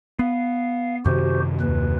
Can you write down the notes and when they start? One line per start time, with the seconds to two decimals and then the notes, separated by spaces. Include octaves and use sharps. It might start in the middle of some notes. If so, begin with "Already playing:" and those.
0.19 B3 F5
1.06 F#2 C3 D#3 F#4 G4 C5
1.60 D#2 B4